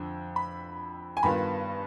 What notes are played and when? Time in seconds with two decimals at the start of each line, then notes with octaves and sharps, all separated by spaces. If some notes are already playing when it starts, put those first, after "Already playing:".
Already playing: F2 D3
0.36 B5
1.17 G#5
1.23 G2 D#3 B3 F4 B5